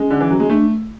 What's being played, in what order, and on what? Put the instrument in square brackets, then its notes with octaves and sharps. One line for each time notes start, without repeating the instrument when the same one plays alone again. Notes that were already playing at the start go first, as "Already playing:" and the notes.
Already playing: [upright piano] G#3 [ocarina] C#4
[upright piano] D3
E3
F#3
G#3
[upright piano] A3 [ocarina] D4